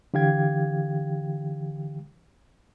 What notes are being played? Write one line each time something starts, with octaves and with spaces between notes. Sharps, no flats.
D3 E3 G4 F5 G5 G#6